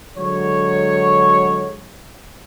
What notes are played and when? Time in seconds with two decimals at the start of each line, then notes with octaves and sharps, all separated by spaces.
0.16 D3 F#3 G#3 C#5